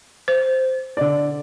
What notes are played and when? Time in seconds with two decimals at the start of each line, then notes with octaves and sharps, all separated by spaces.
0.28 C5
0.97 D3 D5